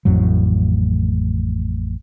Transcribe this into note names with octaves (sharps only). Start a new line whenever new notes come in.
A1 F2 A2 F#3